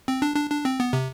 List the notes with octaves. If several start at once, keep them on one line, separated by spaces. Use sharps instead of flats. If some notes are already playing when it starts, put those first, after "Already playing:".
C4
D4
D4
D4
C4
B3
C3